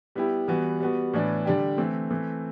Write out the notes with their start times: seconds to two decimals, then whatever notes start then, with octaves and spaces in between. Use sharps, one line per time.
0.15 G3 B3 E4 G4
0.48 E3 G3 B3 F#4
0.80 G3 B3 F#4
1.13 A2 E3 B3 D4
1.45 D3 G3 D4 G4
1.78 E3 A3 C4
2.11 E3 A3 C4